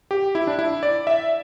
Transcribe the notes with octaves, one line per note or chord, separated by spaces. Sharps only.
G4
E4
D4
E4
D5
E5